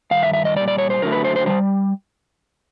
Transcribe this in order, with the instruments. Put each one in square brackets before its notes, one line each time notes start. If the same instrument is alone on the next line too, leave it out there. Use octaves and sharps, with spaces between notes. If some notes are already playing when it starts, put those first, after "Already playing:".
[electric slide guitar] G2 D#3 F5
E5
E5
D#5
G3 D5
A#2
D5
C#5
C5
F#2 D3 F#3 A3 A#4
B4
C5
C5
D#3 G3 C5